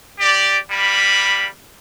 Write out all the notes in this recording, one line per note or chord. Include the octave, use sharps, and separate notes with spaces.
G4 D5
G3 A#3 B5